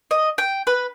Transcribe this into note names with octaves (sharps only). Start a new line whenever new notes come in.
D#5
G5
B4